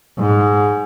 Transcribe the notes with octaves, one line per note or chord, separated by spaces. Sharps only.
G#2